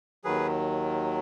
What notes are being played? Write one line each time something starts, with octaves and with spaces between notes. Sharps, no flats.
D#2 D#3 F#3 G#4 B4